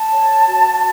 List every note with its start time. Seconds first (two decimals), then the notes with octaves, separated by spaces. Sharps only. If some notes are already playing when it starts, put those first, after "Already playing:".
Already playing: A5
0.13 C#5
0.46 F#4